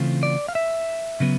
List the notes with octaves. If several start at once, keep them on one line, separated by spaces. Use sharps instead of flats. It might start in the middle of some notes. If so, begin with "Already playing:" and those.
Already playing: C#3 E3 A3 C4 F4
D5
F5
E5
C#3 F#3 B3